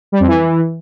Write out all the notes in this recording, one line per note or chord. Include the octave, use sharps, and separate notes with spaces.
G3
F2
E3